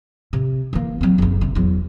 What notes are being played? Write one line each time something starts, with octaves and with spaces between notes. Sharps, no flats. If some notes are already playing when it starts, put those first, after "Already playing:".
C3
E3 A#3
F#3 C4
F#1 B1
C3
E2 F#3